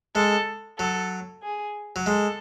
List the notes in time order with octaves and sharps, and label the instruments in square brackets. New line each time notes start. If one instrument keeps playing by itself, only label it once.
[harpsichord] G#3 [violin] A4
[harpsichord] F#3 [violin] A4
[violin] G#4
[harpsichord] F#3
[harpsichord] G#3 [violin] A4